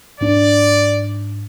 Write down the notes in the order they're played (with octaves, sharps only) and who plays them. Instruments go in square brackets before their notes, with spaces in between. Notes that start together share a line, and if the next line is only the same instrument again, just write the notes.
[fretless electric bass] G#2 D4 [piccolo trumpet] D5